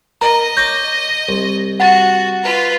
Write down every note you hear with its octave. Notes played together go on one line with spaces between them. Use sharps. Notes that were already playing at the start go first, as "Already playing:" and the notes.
A#4 D#5 A#5
C#5 D6 G6 A#6
C2
F#4 F#5 A6
F4 B4